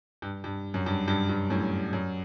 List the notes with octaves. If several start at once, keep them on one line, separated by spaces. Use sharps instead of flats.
G2
G2
F#2
G2
G2
G2
F#2 A2
F#2